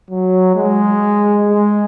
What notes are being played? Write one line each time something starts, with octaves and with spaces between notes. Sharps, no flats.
F#3
G#3
G#3